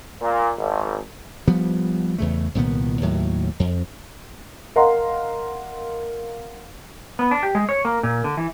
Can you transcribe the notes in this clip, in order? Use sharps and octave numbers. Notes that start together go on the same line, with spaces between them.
A#2
G#1
F3 G3 B3
E2 C#3 A3
C2 A#2 D#3 B3
D#2 A2 F#3
F2
A#4 D#5 F5 F#5 A#5 C6
B3
D4
G4
G#3
C#5
A#3
A#2
D3
E3